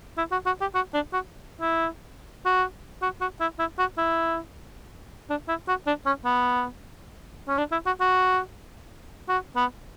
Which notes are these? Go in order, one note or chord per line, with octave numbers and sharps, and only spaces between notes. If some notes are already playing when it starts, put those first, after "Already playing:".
E4
F#4
F#4
G4
F#4
D4
F#4
E4
F#4
F#4
F#4
E4
E4
F#4
E4
D4
E4
F#4
D4
C#4
B3
C#4
D4
E4
F#4
F#4
F#4
B3